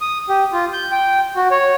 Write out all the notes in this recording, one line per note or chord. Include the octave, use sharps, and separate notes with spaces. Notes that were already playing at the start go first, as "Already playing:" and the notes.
D#6
G4
F4
G6
G5
F#4
C#5